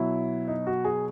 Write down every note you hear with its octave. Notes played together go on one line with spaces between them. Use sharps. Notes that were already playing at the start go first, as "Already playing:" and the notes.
Already playing: B2 F#3 E4
D#4
F#4
G#4